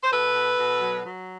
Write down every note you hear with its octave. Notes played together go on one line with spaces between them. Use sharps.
C5
B2 A4 B4
B2
B2
F#3
F#3